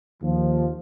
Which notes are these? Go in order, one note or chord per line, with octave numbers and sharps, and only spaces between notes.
D#2 F3